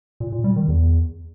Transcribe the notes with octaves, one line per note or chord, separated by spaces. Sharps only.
A#2
A#2
G3
D#3
E2